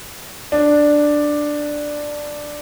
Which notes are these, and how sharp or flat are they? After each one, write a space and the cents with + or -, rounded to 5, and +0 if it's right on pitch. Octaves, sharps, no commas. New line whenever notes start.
D4 +5